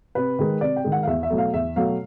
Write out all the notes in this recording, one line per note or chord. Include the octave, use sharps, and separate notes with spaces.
C3 B4
D#3 G#3
C3 D5
G5
D#3 G#3
F#5
F5
E2 E5
E5
B2 F#3 A3
F5
E2 E5
B2 F#3 A3 F5